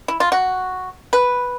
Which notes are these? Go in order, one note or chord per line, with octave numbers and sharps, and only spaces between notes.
E4
F4
F#4
B4